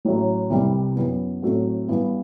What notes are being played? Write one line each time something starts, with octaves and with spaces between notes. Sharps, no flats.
A1 A2 F#3
C2 C3 E3 G3
F#2 E3 B3
A2 F#3 A3 C4 F#4
G2 E3 G3 B3